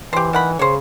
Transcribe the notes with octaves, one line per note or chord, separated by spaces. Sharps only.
E3 G4 C5
D#3 F#5 B5
C#3 C5 C#5